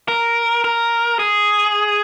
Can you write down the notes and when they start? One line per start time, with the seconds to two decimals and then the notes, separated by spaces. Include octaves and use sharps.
0.08 A#4
0.64 A#4
1.19 G#4